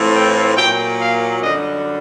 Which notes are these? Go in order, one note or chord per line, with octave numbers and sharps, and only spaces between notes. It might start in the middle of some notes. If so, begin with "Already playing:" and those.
Already playing: A2 E3 A3 C4 F4
G5
A#2 F#3 A#3 G5
F5
F#2 D3 G3 D#5